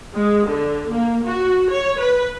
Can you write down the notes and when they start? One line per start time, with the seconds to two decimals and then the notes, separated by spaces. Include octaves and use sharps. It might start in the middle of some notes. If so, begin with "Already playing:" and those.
0.16 G#3
0.48 D3
0.90 A#3
1.26 F#4
1.71 C#5
2.00 B4